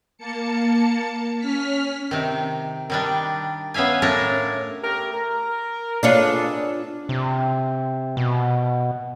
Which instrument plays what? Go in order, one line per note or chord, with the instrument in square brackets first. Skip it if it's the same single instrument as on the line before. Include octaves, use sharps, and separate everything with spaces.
[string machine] A#3 A5 C#7
C#4 F6 B6
[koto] C3 D#3
D#3 G3 D4
B3 C#4 E5 F5 G#5
A2 C#4 D4 A#4
[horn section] A3 G4 A#4
A#4
[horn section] B3 G#4 A4 [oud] D4 F4 C#5
[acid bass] C3
B2